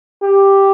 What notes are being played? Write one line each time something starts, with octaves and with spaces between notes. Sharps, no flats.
G4